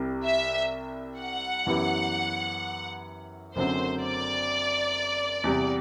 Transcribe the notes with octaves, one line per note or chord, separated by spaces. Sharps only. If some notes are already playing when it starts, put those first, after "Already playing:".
Already playing: C2 C3 G3
E5
F#5
F#2 E3 B3 E4 G4
F#1 F#2 D3 F#3 C4 C5
D5
E2 C3 G3